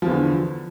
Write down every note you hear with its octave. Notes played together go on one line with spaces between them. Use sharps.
E2 D3 F3